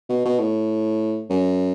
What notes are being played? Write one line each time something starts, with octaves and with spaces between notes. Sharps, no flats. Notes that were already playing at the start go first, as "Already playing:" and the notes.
B2
B2
A2
F#2